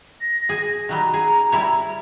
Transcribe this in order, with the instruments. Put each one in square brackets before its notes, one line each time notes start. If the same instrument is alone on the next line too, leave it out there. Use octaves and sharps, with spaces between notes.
[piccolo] A#6
[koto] G#4 G#5
[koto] D#3 F#3 G3 [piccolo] A#5
[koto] G#4
G3 E4 C#5